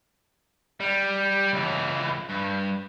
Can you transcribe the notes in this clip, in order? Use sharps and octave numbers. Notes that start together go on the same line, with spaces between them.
G3
C#2 E3
G2